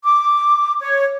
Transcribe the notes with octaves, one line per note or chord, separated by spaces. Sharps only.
D6
C#5